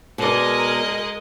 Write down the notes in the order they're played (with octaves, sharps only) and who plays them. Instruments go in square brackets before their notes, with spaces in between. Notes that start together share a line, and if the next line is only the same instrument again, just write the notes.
[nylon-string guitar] B2 D5 [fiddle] G#3 D#5 [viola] A#4 G#5